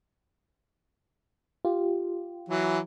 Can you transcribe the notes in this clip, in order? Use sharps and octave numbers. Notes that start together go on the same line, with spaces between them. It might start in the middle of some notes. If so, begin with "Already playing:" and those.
F4 G4
E3 F#3